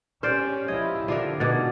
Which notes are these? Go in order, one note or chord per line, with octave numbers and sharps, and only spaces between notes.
C#4 G4 C5 D5 F6 G6 D7
F3 E4 D#5 G#6
D3 F3 D4 A#4
B2 D#3 G#4 F#5 D6 G#6 A6